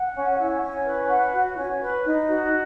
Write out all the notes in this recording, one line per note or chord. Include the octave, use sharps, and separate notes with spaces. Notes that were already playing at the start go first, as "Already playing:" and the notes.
Already playing: F#5
C#4
E4
C#4
B4
F#5
F#4
C#4
B4
D#4
F#4